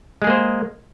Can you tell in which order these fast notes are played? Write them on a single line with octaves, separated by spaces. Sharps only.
G#3 G#4 A#3 C5